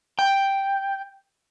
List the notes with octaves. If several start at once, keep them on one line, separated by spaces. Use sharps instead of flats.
G5